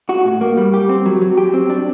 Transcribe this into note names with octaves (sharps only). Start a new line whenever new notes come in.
F#4
A2
A#3
G3
G4
C4
F#3
F#3
G4
C4
D4